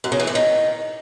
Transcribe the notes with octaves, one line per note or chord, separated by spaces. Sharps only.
F#2
C#3
E3
A2
D#3